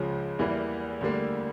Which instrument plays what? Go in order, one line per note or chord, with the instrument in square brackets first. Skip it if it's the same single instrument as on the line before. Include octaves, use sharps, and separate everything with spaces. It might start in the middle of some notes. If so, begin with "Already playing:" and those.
Already playing: [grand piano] C#2 C#3 F3
E2 E3 G3 A#3 E4
D2 D3 G3 A#3